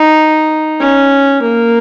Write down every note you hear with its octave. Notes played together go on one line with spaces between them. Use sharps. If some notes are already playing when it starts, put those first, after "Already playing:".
Already playing: D#4
C#4
A#3